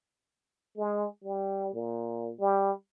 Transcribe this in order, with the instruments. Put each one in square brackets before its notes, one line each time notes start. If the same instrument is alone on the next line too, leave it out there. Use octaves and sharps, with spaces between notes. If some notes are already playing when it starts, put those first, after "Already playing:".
[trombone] G#3
G3
A#2
G3